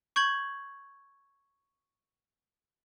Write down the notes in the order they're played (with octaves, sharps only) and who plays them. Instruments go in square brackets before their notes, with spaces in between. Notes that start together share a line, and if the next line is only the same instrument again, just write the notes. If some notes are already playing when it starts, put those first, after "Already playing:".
[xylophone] C#6 G6 G#6 F#7